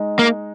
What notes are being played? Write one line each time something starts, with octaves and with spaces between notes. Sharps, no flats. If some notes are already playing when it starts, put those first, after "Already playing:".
Already playing: G#3 D#4
A#3